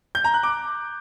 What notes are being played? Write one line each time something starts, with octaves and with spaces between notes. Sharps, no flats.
G6
A#5
F#6
D6